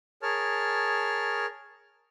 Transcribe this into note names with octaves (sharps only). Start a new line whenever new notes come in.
G#4 A#4 C#5 A5 F6